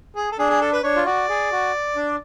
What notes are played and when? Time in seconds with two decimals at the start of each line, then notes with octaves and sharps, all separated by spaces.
0.16 G#4
0.32 A4
0.39 D4 G#4
0.50 G#4
0.61 A4
0.73 B4
0.83 D4 C#5
0.96 F4
1.06 F#4 D5
1.29 G#4
1.52 F#4
1.96 D4